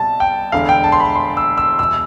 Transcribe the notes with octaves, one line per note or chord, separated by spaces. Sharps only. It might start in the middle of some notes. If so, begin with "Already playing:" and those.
Already playing: C2 B2 G3 A5
G5
E1 E2 D3 F5
G5
A5
C6
B5
C6
E6
E6
E2 B2 E6